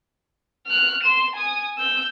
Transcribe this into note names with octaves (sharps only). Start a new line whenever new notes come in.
F6 F#6
C6 E7
G#5 D#6
E6 G6